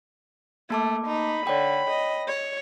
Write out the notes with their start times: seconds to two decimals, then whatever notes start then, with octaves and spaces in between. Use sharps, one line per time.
0.70 A3 A#3 A5 D6
1.07 D#4 B5
1.47 D3 C#5 G5
1.90 D#5
2.28 C#5